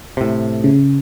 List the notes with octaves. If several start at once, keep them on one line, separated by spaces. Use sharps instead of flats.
A2 C3
C#3